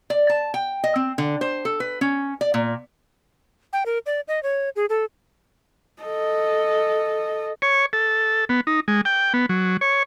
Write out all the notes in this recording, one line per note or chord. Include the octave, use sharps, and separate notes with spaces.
D5
A5
G5
D#5
C4
D3
C5
A4
B4
C#4
D5
A#2
G5
A#4
D5
D#5
C#5
G#4
A4
A4 D#5
C#5
A4
B3
D#4
G#3
G5
B3
F#3
C#5